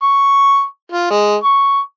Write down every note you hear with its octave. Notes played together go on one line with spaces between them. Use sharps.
C#6
F4
G#3
C#6